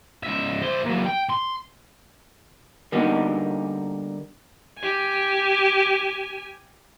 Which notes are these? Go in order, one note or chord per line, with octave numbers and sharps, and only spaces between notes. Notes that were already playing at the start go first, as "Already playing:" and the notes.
C#2 E5
E4 C5
A#2 F#3
G5
C6
D3 G3 A#3 B3 D#4 F#4
G4 G#5